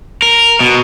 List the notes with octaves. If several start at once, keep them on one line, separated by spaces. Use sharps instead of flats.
A#4
B2